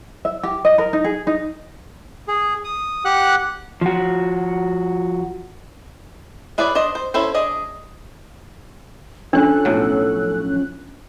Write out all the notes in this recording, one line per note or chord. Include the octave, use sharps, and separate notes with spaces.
E5
G4
D#5
A#4
D#4
G#4
D#4
G#4
D#6
G4 F#5 F#6
F3 F#4
E4 G#4 B4 C#5 D5
D4 C5 D5 D#5
C5
C#4 E4 A4 C5
D4 G#4 D#5
F3 C#4 D4 A4 F#6
B1 A2 F#3